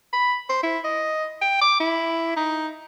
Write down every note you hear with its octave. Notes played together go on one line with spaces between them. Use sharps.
B5
C5
E4
D#5
G5
D6
E4
D#4